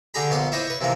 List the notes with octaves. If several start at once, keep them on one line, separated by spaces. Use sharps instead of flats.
D3 G4 G#4 A#5 B5
A#1 B3 C6 D6
E4 C5 C#5 D#5 B5 D6
B4 C#5
C3 E3 F3 A#3